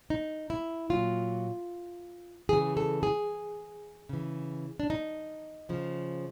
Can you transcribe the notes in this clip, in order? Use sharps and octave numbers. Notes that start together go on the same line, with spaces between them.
D#4
E4
A#2 F#3 F4
C#3 E3 G#4
A4
G#4
C#3 E3
D4
D#4
C#3 F3